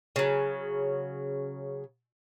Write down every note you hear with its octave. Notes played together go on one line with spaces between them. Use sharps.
C#3 F#3